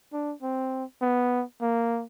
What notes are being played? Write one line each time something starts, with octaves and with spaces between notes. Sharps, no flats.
D4
C4
B3
A#3